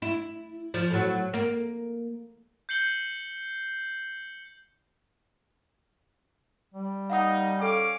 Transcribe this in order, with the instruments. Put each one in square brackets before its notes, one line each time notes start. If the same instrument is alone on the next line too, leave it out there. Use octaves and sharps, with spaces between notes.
[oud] E4
F3
A2 F#3
A#3
[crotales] G6 C7 C#7 F#7 G7
[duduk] G3
[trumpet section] A#3 D#4 [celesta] F5 F#5 D#6
[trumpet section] C#4 F5 D6 [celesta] A4 G5